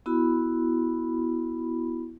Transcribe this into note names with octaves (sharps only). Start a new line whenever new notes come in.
B3 E4 F#4 B5